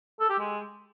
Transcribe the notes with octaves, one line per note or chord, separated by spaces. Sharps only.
A4
G4
G#3